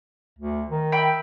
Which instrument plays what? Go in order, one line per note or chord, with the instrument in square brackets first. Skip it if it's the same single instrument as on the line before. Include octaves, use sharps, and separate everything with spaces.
[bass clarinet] D2
D#3
[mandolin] E5 G5 B5